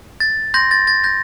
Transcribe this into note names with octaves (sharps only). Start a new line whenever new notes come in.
A6
C6 G6 A#6
A6
A6
G6 A#6